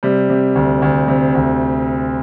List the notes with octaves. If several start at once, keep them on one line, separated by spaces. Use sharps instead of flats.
C3 G3
C3
D2
D2
C3
D2